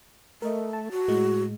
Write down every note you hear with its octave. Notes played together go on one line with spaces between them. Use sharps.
A3 A#4 D#5
A5
F#4
A2 G#3